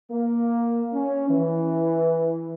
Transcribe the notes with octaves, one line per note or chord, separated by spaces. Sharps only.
A#3
C#4
E3